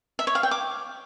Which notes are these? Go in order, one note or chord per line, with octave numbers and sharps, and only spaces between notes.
E5
C#5
F5
G5
D6